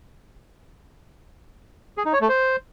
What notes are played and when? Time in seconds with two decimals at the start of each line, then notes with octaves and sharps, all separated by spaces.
1.98 G#4
2.05 D#4
2.13 C#5
2.21 A3
2.29 C5